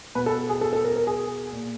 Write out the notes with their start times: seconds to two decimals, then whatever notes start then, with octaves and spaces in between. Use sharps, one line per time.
0.15 B2 B4
0.26 A4
0.49 G#4
0.61 A4
0.73 A4
0.84 A#4
0.96 A#4
1.07 G#4
1.52 A#2